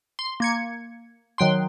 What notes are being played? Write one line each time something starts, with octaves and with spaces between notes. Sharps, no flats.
C6
A#3 G#6 C#7
D#3 F#3 G5 C6